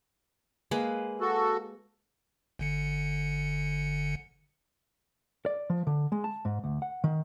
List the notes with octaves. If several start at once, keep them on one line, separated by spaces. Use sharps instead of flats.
G#3 A#3 B4
F#4 A4
G1 D3 C#7
D5
F3
D3
G#3
A5
G#2
D2
F#5
D#3